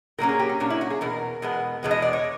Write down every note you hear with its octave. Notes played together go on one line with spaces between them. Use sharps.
A#2 F#3 A#3 C#4 A#4
G#4
G4
C#4
A#2 F#3 A#3 C#4 D4
E4
F#4
G#4
E2 B2 A#4
E2 B2 G#3 B3
E2 B2 G#3 B3
D#5
D5
C#5